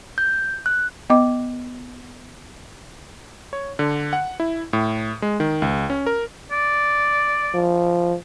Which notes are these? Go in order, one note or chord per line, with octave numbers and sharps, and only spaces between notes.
G6
F#6
B3 D#5 D6
C#5
D3
F#5
E4
A2
G#3
D#3
C#2
C#4
A#4
D5
F3